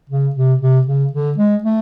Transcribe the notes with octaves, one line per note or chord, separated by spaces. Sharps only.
C#3
C3
C3
C#3
D3
G#3
A3